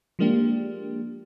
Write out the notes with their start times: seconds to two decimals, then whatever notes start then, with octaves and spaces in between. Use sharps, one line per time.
0.19 F3 G#3 A#3 D4 G4